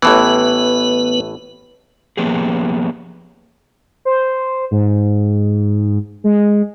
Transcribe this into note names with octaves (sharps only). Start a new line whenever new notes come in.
A1 A2 E3 B3 B4
F3 A#3 B3 C#4 G4 G#4
C5
G#2
G#3